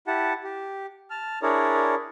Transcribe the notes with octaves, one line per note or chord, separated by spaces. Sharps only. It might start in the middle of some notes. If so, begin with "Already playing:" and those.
E4 G4 F#5 A5
G4
A5 F6
D4 E4 G#4 A#4 C#5 D5